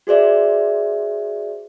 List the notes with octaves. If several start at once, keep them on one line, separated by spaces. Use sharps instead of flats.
F#4 G#4 C5 D5 E5